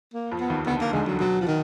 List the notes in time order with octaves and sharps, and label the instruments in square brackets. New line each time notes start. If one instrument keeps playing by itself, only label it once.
[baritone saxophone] A#3
[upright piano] F2 F3
[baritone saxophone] B3
[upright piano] D#2 D#3
[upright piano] D2 D3 [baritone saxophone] B3
[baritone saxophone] A#3
[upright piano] D2 D3 [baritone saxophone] G#3
[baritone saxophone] F#3
[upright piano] B2 [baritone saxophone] F#3
[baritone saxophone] F3
[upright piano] B2 [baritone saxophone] D#3